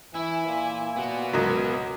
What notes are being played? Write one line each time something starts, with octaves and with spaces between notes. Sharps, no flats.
E3 E4 E5 G#5
A#2
B3 F#4
C#2 F#3 A#4